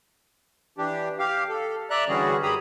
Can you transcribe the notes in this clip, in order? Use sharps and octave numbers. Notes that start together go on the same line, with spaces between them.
E3 D4 G4
G4 F5
A4
D5 E5 A#5 F#6
D3 E3 G3 C#4 F#4 G#4
F#2 G4 G#4 A#5 B5 D#6